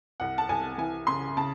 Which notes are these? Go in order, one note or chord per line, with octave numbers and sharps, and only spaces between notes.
C2 F#5
A5
C2 G#5
E3 G#5
C#3 C6
C#3 A5